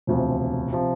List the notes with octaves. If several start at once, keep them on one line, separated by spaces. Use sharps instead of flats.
E1 D2 C3 F3
C3 F3